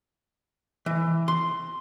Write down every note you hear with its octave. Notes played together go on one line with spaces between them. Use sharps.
E3
C6